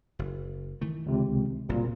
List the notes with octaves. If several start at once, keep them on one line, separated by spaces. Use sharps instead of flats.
F#1
D#3 E3 A3
C#2 C3
F#1 C2 A#2